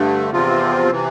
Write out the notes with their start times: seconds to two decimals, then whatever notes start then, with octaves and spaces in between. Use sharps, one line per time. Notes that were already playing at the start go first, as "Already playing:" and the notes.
Already playing: G2 D3 A3
0.31 E2 C3 F3 C4 F4
0.91 C3 E3